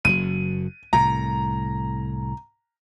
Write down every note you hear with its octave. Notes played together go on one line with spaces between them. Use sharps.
F#1 B2 F#3 D#7
C2 A2 A#5